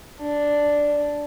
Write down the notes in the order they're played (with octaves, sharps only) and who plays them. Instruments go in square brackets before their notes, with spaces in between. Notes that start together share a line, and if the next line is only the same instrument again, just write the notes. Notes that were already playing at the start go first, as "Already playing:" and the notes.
[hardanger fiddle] D4